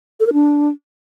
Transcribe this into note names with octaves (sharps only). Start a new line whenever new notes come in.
A4
A#4
D4